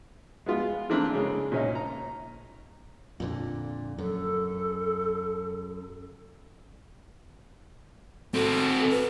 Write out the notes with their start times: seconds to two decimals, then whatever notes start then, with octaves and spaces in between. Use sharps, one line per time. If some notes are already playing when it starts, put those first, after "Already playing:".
0.46 G#3 B3 F4
0.90 E3 A3 A#3 C4 D4
1.12 C#3 G#3
1.52 A#2 C#4 D#4
1.75 A#5
3.20 F2 A#2 D3
3.98 F#2 A4
8.34 C4 F#4 A4
8.91 B4